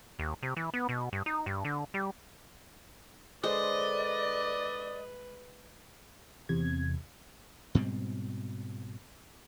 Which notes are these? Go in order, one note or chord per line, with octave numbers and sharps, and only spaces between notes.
D#2
C3
E3
B3
B2
G2
D#4
G2
D3
G3
D3 G#3 B4 C5 D5 D#5
E2 C3 G#6
G#2 B2 G3 C4